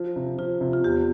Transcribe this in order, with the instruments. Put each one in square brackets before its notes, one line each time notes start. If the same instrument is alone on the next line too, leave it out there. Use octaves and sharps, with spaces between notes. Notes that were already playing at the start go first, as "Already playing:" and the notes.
Already playing: [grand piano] F3 [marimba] F4
[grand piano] C3
[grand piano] F3 [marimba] F4
[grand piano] C3
[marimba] F4
[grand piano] E2 [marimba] G4